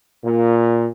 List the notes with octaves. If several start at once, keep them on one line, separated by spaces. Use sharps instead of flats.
A#2